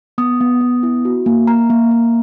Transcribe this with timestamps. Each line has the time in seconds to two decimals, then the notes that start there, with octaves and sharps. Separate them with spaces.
0.18 B3 D#6
0.41 B3
0.61 B3
0.83 E4
1.05 F#4
1.26 A#3
1.47 A#3 A#5
1.70 A#3
1.91 A#3